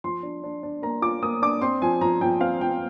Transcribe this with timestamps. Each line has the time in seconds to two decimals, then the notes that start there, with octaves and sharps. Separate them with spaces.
0.04 F3 C6
0.23 D4
0.43 D4
0.63 D4
0.82 A#3 A#5
1.02 F4 D6
1.22 A#3 D#6
1.42 D4 D6
1.61 C4 C6
1.82 F3 G#5
2.01 F3 A#5
2.21 F3 G5
2.41 C4 F5
2.61 F3 G5